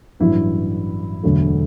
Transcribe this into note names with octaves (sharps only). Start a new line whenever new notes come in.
A1 G2 F#3 E4
E1 D2 D3 F#3 A3